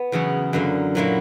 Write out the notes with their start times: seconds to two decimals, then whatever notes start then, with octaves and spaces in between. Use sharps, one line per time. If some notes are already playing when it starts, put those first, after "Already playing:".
Already playing: B3
0.12 E2 C#3 F#3 C#4 E4
0.53 F#2 D3 A#3
0.95 A#2 F#3 A#3 E4